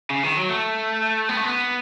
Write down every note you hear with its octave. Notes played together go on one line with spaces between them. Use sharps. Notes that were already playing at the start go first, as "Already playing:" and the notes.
C#3
D#3
F#3
A3
B3
A3
B3